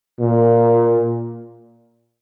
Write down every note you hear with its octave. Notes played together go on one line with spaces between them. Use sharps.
A#2